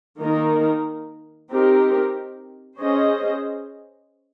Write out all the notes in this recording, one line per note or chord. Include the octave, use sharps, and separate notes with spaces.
D#3 A#3 D#4 A#4
C4 D#4 G4 A#4
C#4 G#4 C5 D#5